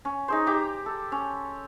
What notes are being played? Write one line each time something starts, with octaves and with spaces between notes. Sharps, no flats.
C#4
D#4 G#4 C5
G4 A#5 D6
A4
C#4